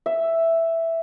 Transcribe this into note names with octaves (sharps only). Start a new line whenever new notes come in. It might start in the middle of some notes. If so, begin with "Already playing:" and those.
E5